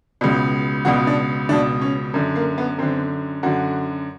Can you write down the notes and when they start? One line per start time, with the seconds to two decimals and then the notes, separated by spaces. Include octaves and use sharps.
0.21 C#2 B2
0.85 C#2 B2 F#4
1.07 D4
1.49 C#2 B2 D4
1.82 C#4
2.14 F#2 D3
2.36 A#3
2.58 B3
2.78 F#2 D3 C4
3.43 F#2 D3 F#4